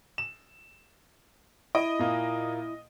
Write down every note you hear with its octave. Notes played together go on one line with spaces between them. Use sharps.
E7
E4 D#5 D7
A#2 A#3